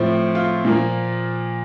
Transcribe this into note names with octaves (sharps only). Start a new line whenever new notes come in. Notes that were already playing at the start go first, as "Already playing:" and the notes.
Already playing: A2 F3 C4
F4
A#2 F3 A#3